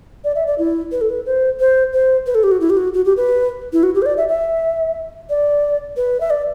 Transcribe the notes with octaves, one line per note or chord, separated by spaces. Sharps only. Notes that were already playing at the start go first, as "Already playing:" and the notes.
D5
E5
D5
E4
B4
A4
B4
C5
C5
C5
B4
A4
G4
F#4
E4
G4
F#4
F#4
G4
B4
E4
F#4
G4
C5
D5
E5
E5
D5
B4
E5
D5